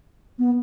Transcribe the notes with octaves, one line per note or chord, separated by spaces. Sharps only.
B3